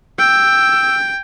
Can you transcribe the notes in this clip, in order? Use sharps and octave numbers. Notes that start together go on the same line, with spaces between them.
G5 E6